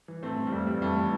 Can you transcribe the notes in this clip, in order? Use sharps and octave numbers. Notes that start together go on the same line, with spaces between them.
E3
A2 A3 C4
E3
G3
F2 A3
E3 G3
F2 A3
E3